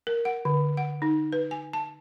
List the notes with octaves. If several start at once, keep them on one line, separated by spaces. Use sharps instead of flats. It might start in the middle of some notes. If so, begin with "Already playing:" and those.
A#4
F#5
D3
F#5
D#4
B4
G#5
A5